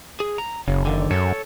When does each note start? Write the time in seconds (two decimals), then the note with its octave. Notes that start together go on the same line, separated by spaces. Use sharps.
0.20 G#4
0.38 A#5
0.68 F#1 C#3
0.85 D3 D#3
1.11 F#2 A4 C#5